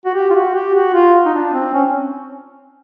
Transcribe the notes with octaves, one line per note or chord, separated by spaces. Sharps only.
F#4
G4
F4
F#4
G4
F#4
F4
D#4
D4
C4
C#4